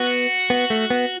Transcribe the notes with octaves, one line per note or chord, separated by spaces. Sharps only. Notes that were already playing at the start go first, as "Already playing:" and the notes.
Already playing: B3 F#4
B3
A3
B3